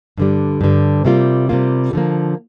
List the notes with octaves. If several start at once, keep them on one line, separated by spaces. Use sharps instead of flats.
G2 D3 G3
G2 D3 G3
C3 G3 A#3 F4
C3 G3 A#3 F4
D3 F3 A#3